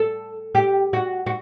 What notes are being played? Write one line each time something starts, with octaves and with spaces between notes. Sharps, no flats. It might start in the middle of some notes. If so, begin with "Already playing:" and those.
Already playing: A4
G4
F#4
F#4